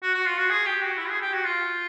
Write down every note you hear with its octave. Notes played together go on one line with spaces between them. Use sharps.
F#4
F#4
F4
F#4
G#4
G4
F#4
E4
G#4
G4
F#4
F4